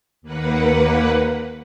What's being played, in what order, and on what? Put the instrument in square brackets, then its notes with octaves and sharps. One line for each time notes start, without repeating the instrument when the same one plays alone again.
[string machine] D#2 A#3 B4 F#5